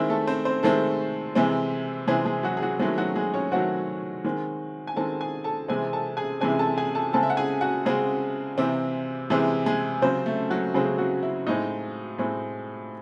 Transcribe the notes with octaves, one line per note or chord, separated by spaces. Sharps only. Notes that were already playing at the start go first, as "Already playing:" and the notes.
Already playing: D#3 G#3 C4 E4 E5
A3 A4
C4 C5
C4 C5
D#3 G#3 A3 C4 A4
C3 E3 G#3 C4
C3 E3 G#3 C4 G#4
G#3 G#4
F#3 F#4
G#4
F#3 F#4
D#3 F#3 G#3 A3 C4 G#4
F#3 F#4
G#3 G#4
C#4 C#5
D#3 F#3 A3 C4 F#4 F#5
D#3 G#3 C4
G#5
D#3 G#3 C4 A4 A5
G#4 G#5
A4 A5
C3 E3 G#3 C4 G#4 G#5
A4 A5
G#4 G#5
C3 E3 G#3 C4 G#4 G#5
A4 A5
G#4 G#5
A4 A5
C#3 G#3 C4 A4 A5
E5
F#5
G#4 G#5
F#4 F#5
C#3 G#3 C4 G#4
C3 E3 C4
C3 E3 G#3 C4 G#4
G#3 G#4
C#3 F#3 C4 C5
A3 A4
F#3 F#4
C#3 F#3 G#3 C4 G#4
F#3 F#4
E4
A2 G#3 C4 D#4
A2 G#3 C4